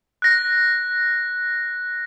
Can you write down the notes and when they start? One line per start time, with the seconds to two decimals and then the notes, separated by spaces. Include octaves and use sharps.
0.22 F#6 A#6